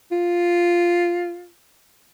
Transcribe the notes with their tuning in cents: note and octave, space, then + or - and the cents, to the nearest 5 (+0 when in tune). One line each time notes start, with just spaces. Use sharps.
F4 +0